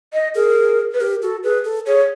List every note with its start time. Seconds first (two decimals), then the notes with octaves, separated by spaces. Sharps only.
0.13 D#5
0.35 G#4 A#4
0.94 B4
1.00 G4 A#4
1.21 F#4 A4
1.43 G#4 B4
1.64 A4
1.87 G#4 C#5